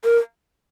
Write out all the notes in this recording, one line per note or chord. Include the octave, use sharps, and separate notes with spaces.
A#4